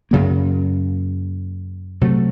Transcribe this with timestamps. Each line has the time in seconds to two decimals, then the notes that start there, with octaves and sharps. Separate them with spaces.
0.11 F#2 C#3 F#3 A#3
2.01 C3 F#3 A3